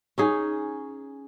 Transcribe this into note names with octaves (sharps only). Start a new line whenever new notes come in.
C#4 D#4 G#4